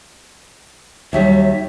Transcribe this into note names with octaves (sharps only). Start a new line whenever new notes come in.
D#2 F#3 G3 E5